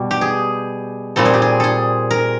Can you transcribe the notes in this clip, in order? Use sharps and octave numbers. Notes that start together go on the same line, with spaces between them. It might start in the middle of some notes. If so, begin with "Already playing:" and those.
Already playing: B2 G3
G4
G#4
A#2 G3 C4 A4
G#4
G4
G#4
G#4 A4
A#4